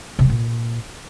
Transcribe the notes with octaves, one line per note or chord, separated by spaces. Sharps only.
C3
F#3
A#2